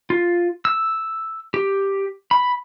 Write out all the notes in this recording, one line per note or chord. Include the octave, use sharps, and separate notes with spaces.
F4
E6
G4
B5